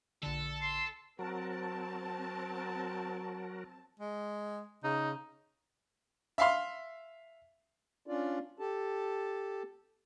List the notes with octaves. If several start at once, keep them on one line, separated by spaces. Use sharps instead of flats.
A#1 D3 A4
C6
F#3 C4 F#4 A#4 A5
G#3
C#3 D#4
E5 F5 C6
C#4 D4 F4 D5
G4 A4 A5